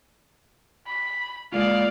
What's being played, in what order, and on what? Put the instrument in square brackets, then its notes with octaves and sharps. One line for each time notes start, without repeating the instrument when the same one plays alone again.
[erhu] B5
[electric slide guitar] G#3 A#3 F4 [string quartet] D5 [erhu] F5